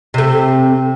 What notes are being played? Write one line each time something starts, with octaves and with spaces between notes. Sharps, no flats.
C3 A3